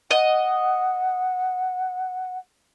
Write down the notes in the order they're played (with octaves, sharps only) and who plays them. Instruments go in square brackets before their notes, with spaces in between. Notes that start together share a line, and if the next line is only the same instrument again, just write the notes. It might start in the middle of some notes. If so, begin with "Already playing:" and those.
[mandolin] D#5 [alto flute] F#5